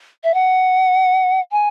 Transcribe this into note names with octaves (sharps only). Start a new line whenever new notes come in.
E5
F#5
G#5